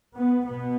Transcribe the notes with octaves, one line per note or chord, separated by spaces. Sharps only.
B3
B2 B3